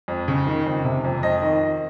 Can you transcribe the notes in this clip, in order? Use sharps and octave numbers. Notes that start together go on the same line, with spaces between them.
F2
C#3
D#3
F2
C3
F2
F2 D#5
D#3